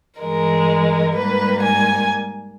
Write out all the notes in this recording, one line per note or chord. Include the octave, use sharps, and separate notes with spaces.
G2 E3 G#3 A#4
G#2 G3 A#3 B4
G#5